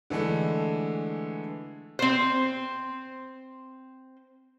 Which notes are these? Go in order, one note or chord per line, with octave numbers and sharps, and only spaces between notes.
D3 E3 G#3 A3
C4 C5